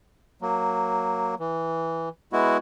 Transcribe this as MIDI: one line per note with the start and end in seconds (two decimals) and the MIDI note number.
0.42 1.35 54
0.42 1.35 58
1.39 2.09 52
2.33 2.57 56
2.33 2.57 59
2.33 2.57 64
2.33 2.57 66